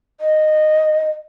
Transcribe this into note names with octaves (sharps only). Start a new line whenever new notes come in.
D#5